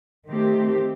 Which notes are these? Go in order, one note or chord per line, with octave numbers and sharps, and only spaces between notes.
D#3 A3 C4 G4